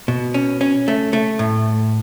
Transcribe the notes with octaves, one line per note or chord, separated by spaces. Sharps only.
B2
C#4
C#4
A3
A3
A2